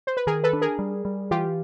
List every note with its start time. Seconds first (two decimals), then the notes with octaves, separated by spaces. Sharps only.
0.07 C5
0.17 B4
0.27 D#3 G#4 A#4
0.44 A4 B4
0.53 D4
0.62 G#4 A#4
0.79 G3
1.05 G3
1.31 E3 F4 G4